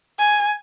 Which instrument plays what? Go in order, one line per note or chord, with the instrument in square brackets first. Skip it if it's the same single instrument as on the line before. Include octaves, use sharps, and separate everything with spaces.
[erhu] G#5